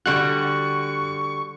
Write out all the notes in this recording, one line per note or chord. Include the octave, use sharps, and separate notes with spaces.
D3 G3 F#4 C#6 F#6